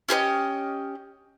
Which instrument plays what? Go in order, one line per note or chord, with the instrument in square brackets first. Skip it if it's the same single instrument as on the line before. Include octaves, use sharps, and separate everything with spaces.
[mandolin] C#4 G4 A#4 D#5